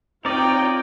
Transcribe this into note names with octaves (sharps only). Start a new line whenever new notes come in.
C4 D#4 F4 A#4 C#5 D5 G5